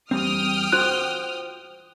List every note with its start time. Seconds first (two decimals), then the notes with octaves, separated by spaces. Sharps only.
0.11 E2 G3 C4 G5 D#6 F6
0.72 F4 F#4 C5 F#6